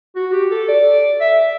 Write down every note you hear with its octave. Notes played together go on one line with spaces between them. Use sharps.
F#4
G4
A4
D5
E5